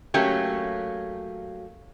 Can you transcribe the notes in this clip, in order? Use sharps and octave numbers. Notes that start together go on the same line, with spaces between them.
F#3 A3 A#3 C#4 G4